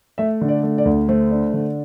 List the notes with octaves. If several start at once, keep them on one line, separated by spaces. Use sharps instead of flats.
A3 E5
D3
D5
A3
D5
D2
A3 C5
D4
D3